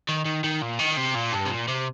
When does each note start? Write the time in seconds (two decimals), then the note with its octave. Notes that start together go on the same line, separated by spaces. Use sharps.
0.09 D#3
0.25 D#3
0.44 D#3
0.62 A#2
0.79 D#3
0.97 C3
1.15 A#2
1.32 G2
1.45 C3
1.50 A#2
1.68 C3